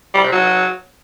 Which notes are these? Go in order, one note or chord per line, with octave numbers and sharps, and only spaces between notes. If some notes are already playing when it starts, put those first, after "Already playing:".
G3
C3
F#3